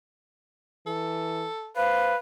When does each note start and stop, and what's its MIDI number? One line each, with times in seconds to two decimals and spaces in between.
0.87 1.45 52
0.87 1.71 69
1.77 2.17 71
1.77 2.11 72
1.77 2.14 77